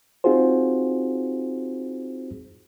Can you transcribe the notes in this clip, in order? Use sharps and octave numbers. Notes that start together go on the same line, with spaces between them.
C4 D#4 F4 F#4 G#4 C5